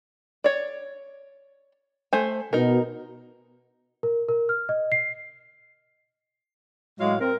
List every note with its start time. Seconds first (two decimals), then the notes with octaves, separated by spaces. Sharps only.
0.44 C#5 D5
2.13 A3 C5 G#5
2.53 B2 D#4 A#4
4.03 A#4
4.29 A#4
4.49 F6
4.69 D#5
4.92 C7
7.00 A2 F#3 G#3 F5
7.20 C4 A#4